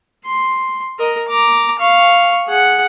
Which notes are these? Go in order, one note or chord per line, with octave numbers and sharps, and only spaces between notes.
C6
A#4 D#5
A#5 D6
F5 C#6
G#4 F#5